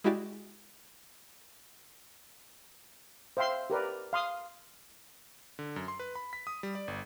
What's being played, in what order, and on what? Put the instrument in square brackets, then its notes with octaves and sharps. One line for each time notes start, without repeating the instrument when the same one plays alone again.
[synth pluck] G#3 E4 F#4 G4 D5
[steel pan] C5 E5 F5 G5 C6
G4 A#4 B4 D5
F5 C6 D#6
[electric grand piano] D3
F#2
C6
B4
B5
B6
D#6
G3
D5
G1